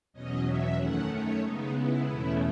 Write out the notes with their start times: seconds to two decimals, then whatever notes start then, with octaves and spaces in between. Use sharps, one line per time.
0.13 E2 B2 F#3 C#4 D#5
0.45 E5
0.77 F#2 D#3 A3 C#4 F#5
1.09 C#5
1.41 C#3 G#3 B3 D#4
1.73 E4
2.04 E2 B2 A3 C#4 E4